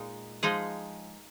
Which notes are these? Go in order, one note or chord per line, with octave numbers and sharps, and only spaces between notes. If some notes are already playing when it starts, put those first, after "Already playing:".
Already playing: A#2 G#3 D#4
F3 G#3 D#4 G#4